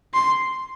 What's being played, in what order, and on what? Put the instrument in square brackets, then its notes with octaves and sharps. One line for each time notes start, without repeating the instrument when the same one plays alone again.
[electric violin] C6